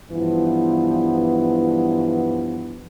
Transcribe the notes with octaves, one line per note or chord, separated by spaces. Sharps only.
G2 E3 F3 B3